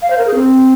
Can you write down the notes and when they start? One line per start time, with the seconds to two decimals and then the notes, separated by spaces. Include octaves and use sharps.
0.02 F5
0.10 C5
0.18 A#4
0.27 G#4
0.35 C4